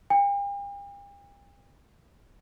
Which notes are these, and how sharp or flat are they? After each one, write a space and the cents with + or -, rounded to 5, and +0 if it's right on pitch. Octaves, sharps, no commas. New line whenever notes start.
G5 +45